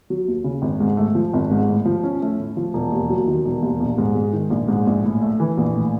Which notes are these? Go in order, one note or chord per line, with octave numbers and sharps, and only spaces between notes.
F#3
D#2
C#3
G#1
G#2
A3
F3
G#1
G#2
A2
F3
C#4
A3
A2
F3
E1
D#2
F#3
D#3
E1
D#2
A#1
G#2
G#3
D#3
A#1
G#2
A#1
A2
A3
E3
A#1
A2